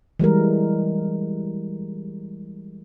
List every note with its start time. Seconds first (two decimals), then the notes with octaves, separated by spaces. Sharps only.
0.19 E3 G3 G#3 A#4